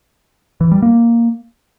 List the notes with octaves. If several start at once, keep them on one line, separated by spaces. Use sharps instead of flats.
E3
G3
A#3